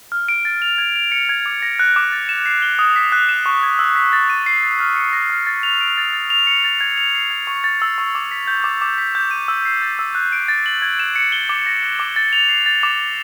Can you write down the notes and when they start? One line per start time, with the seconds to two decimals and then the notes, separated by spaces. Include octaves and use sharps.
0.12 F6
0.29 D7
0.45 A6
0.62 F7
0.78 G#6
0.96 F7
1.12 C#7
1.29 G#6
1.46 D6
1.62 A#6
1.79 F#6
1.96 D6
2.12 A6
2.29 E7
2.46 C7
2.62 G7
2.79 D#6
2.96 B6
3.12 F#6
3.29 E7
3.46 C#6
3.63 G#6
3.79 E6
3.96 B6
4.13 A6
4.30 D#7
4.46 C7
4.63 A6
4.80 F6
4.96 C#7
5.13 A#6
5.30 F6
5.47 A6
5.63 F7
5.81 D7
5.98 A6
6.13 A6
6.30 F7
6.47 C#7
6.64 A6
6.81 G#6
6.97 F7
7.15 C7
7.31 G#6
7.47 C#6
7.64 A6
7.82 E6
7.98 C#6
8.15 D6
8.31 B6
8.47 G6
8.64 D6
8.82 D6
8.98 B6
9.15 G6
9.31 D#7
9.48 E6
9.65 C7
9.82 A6
9.99 E6
10.15 F#6
10.32 D7
10.48 A6
10.66 F#7
10.82 G#6
10.99 E7
11.16 C#7
11.32 G7
11.49 D6
11.66 A#6
11.82 F#6
12.00 D6
12.16 A6
12.33 F7
12.49 C7
12.66 A6
12.83 D6
13.00 A6